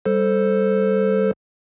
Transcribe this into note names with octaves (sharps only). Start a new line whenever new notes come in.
G3 A4 C5